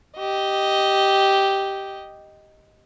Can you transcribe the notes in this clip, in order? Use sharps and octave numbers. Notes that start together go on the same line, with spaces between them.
G4 D#5